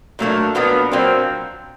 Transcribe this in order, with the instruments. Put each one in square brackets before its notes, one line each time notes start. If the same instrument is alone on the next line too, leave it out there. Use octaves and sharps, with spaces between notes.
[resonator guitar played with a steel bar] A#2 F#3 A#3 D4 [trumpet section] A3
[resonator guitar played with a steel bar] A#2 F#3 A#3 D4 [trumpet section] B3
[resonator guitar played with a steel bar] A#2 F#3 A#3 D4 [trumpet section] C4